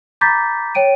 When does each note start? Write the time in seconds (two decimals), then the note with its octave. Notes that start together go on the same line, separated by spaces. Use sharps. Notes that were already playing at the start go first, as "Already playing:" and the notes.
0.21 A#5 B5 D6 G6 A6 B6
0.75 C#5 G5 D7 D#7